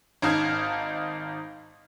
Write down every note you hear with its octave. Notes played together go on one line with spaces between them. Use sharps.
G#1 D#4 F5 A5 F6 G#6